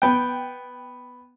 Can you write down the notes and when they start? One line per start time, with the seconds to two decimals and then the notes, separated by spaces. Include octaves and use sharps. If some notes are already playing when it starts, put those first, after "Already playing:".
0.02 B3 G5